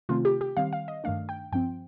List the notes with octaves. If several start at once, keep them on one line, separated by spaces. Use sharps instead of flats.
C3 D#3 A3 C4 F4
G4
G4
D#3 G3 C4 F5
F5
D#5
G2 D#3 A3 D4 F5
G5
G2 F3 C4 G5